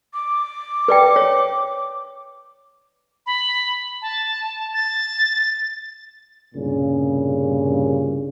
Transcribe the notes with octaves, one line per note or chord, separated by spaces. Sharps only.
D6
B4 D5 G5
C#5
B5
A5
A6
C2 G2 A#2 C#3